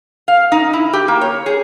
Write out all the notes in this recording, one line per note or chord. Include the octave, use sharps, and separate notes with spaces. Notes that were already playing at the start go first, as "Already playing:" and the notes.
F5
D#4
E4
G4
A#3
C#5
G#4